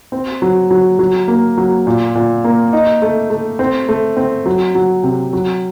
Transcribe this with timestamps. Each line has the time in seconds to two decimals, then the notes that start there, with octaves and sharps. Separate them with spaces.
0.12 C4
0.42 F#3
0.70 F#3
0.99 F#3
1.28 A#3
1.57 F#3
1.87 A#2
2.15 A#2
2.44 A#3
2.73 D#4
3.02 A3
3.30 A3
3.59 C4
3.89 A3
4.17 C4
4.46 F#3
4.75 F#3
5.03 C3
5.33 F#3